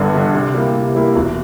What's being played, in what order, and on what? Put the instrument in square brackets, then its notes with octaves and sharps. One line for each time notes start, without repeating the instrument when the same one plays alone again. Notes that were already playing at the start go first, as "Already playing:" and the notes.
Already playing: [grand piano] G1 G2 D3
G2 D3
C3
G3 A#3 E4
C3
G3 A#3 E4
E1